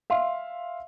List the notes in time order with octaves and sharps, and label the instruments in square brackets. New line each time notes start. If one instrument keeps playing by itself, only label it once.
[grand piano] E5 F5 C6